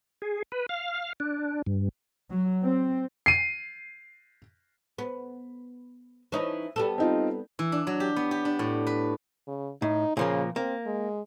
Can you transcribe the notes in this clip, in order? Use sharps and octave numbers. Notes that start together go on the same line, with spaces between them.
G#4
B4
F5
D4
G2
F#3
C4
C7 D#7
B3
E3 C#4 D#4
G3 B3 A4
C4 D#4 F4
E3
D4
F#3
G4
B3
G4
D4
A2
B4
C#3
A2 D#4
A#2 C#3 F3 A#3
A#3 C4
G#3